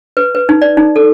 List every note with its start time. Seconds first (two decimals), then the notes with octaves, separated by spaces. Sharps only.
0.17 B4
0.35 B4
0.49 D#4
0.62 D5
0.77 D#4
0.96 A4